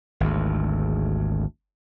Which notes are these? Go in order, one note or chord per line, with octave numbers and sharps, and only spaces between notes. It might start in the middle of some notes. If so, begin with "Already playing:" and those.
G#1 D2